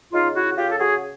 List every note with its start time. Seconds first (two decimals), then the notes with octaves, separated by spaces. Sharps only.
0.13 C#3 D#4 F4
0.35 E4 F#4
0.57 C#3 F4 G4
0.71 A4
0.80 F#4 G#4